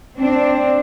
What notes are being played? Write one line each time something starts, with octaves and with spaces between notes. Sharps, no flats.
C4 D4